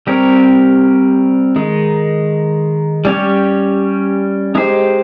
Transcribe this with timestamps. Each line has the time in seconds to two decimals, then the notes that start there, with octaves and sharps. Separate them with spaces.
0.07 G3 C4 G4 A#4 C#5
1.56 D#3 G#3 D#4
3.05 G3 C#4 G4 C#5
4.55 G#3 D#4 G4 C5